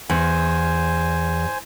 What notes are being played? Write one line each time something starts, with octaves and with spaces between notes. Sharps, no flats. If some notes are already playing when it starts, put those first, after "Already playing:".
E2 C5 G#5